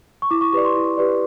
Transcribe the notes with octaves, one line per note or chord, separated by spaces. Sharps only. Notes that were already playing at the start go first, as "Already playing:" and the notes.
C#6
E4 D6
C#6
G4 B4 D5 C#6
C6
E4
G4 B4 D5